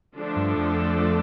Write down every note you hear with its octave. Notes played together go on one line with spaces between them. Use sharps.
D3 F3 A3 D4 A4
G2
F2